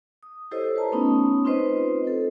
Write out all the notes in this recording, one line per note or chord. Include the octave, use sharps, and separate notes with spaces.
D#6
E4 G4 A4 C5 C#5 D#5
F4 B4 C5 A5 A#5
A3 B3 C#4 D#4 C#5 D#6
C4 D#4 F4 B4 C5 D#5
A4 C5